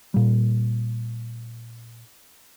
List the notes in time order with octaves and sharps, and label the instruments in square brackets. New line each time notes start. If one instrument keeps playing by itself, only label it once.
[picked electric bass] A#2 G3